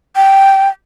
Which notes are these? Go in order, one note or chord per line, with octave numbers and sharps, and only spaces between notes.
G5